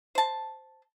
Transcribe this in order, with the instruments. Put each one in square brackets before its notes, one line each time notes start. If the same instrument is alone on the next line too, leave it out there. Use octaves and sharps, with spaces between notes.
[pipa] C5 A5